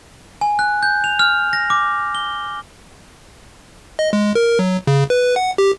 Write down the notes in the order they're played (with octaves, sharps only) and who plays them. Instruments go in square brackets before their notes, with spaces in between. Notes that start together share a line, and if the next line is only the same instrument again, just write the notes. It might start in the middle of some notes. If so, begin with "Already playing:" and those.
[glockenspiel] G#5
F#6
G6
F7
F6
A#6
D6
G7
[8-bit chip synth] D#5
G#3
A#4
F#3
C#3
B4
F#5
G4